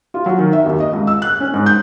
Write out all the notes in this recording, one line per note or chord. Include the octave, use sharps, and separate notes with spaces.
F4
F#3
D#3
E5
D#2
D#5
C#2
E6
F#6
C#4
G#2
G6